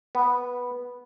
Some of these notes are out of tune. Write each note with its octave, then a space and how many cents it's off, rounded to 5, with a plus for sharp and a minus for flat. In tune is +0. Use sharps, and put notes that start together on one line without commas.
B3 -5